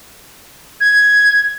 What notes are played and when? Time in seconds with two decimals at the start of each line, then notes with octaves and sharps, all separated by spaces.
0.81 G#6